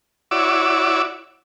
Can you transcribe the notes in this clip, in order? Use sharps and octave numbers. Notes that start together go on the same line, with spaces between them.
E4 F#4 C#5 D5 D6 E6